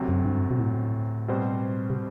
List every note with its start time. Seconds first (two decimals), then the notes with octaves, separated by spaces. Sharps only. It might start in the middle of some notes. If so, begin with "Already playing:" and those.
Already playing: D2 C3 F#3 C4
0.08 F#2
0.25 G2
0.51 B2
0.60 A2
1.28 B2 G3 C4 F#4 C5
1.90 C3